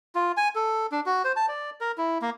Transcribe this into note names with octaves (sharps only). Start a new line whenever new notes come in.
F4
G#5
A4
D4
F#4
C5
A5
D5
A#4
E4
A#3